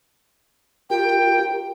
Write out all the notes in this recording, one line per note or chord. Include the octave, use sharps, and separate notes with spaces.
F4 G4 A#4 G5